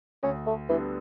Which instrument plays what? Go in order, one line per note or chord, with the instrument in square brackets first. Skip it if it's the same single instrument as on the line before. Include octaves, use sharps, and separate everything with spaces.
[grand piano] D2 [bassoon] C#4
[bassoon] A3
[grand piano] D3 G3 B3 [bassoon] E3